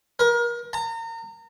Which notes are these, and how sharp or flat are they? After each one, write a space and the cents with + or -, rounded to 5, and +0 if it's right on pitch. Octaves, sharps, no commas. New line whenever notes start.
A#4 +30
A#5 -35